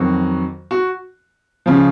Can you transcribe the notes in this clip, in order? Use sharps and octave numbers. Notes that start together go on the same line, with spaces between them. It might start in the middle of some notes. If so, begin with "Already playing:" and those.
Already playing: F2 D#3 F#3 F#4
F#4
C#3 F3